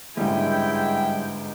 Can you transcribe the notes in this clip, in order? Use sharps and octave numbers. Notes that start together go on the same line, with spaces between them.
G1 G#2 G3 G#3 C#4 E4 G5